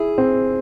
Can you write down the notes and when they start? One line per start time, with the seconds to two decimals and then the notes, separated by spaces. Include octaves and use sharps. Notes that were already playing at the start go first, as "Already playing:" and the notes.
Already playing: E4 G#4
0.18 C4